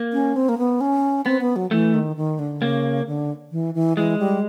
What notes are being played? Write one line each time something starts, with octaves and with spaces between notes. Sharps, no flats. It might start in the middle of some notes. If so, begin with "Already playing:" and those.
Already playing: A#3
C#4
C4
A#3
B3
C#4
B3 C4
B3
F#3
E3 A3
D#3
D#3
D3
C#3 A#3
D3
E3
E3
E3 G#3
G3